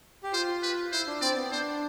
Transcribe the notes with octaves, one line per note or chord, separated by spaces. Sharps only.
G4
F4 C5
B4
E4 C5
D4
C4 D5
B3
D4 C5